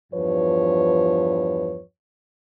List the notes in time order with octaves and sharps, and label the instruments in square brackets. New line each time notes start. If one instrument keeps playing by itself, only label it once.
[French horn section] E2 G2 F3 B4 C#5